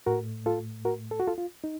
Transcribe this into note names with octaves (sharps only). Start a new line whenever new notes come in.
A2 A3 F#4 A#4
F4 A4
F#4 A#4
A4
F#4
F4 A4
F4
D#4